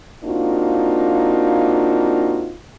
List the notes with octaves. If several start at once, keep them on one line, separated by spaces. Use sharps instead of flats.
A#3 C4 D4 D#4 F4 F#4